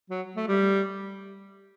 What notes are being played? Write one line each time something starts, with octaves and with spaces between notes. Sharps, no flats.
F#3
A3
G3